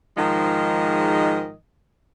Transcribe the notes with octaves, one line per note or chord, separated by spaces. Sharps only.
G#2 D#3 F3 G#3 D#4 D#5